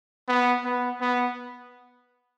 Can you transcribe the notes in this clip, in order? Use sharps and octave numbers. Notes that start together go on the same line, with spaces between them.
B3
B3
B3